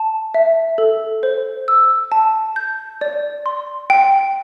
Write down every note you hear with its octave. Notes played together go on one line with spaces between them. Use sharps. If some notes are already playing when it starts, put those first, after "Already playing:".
Already playing: A5
E5
A4
C5
E6
A5
G6
D5
C6
G5